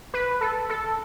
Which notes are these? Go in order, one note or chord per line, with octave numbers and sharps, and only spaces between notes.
B4
A4
A4